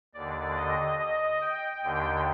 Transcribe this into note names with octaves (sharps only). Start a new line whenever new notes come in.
D#2 D3 D5
D#5
D#5
G5
D#2 D3 G5